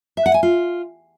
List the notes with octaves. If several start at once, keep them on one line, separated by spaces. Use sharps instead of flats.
E5
F#5
G#5
F4